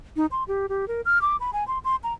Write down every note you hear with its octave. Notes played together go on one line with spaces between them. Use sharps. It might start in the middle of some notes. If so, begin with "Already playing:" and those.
D#4
C6
G4
G4
A#4
F6
D6
B5
G#5
C6
C6
A#5